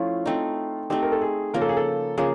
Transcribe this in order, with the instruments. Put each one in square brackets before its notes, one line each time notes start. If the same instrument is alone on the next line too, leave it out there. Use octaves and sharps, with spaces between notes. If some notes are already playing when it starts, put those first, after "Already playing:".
Already playing: [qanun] F3 A3 C#4 E4 [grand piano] F4
[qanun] A3 C4 D#4
[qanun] A3 C4 D#4 [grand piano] G4
[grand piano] A#4
A4
G#4
[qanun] C#3 F3 A#3 [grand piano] A#4
[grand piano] A4
G#4
A4
[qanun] C#3 F3 A#3 [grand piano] G#4